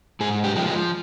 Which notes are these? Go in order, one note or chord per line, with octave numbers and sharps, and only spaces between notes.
G#2 G#4
G4
F3 G#3
G#3